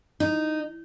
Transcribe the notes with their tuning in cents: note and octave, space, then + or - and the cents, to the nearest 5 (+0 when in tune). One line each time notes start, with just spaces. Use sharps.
D#4 -10